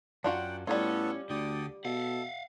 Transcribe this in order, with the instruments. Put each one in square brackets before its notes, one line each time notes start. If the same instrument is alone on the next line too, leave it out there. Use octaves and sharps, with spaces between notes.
[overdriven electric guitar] F#2 [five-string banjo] D4 F4 F#4 [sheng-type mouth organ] F#5 G5
[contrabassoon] A2 [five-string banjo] G3 F4 [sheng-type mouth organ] B3 A4 C#5 [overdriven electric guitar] C#4
[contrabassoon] D2 [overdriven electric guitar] D3 [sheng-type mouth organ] D5 G5 D#6
[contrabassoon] B2 [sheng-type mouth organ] A4 [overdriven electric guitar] F5 F#5